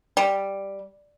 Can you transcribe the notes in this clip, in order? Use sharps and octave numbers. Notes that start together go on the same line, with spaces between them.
G3